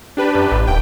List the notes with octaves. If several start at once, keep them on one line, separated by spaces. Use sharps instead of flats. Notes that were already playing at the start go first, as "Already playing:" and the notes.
D4 G4 B4
F#2
A1
D#1 G5